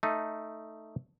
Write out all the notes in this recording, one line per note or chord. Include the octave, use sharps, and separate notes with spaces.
A3 D#4